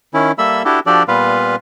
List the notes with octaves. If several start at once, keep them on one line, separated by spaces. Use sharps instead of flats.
D#3 C#4 E4
G3 A#3 A4 E5 B5 E6
D4 E4 F#4 G4 A4
F3 D4 F#4 G4 A4 D5
A#2 G3 B3 F4 B4 F5